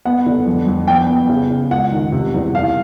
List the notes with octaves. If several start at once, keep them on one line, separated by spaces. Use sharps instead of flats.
B3 F#5
D3
F2
F2
B3 G5
B3
C#3
C#3
C#2 F#5
D#3
C3
E2
C2 F5